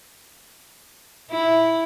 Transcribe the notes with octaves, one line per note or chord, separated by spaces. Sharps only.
E4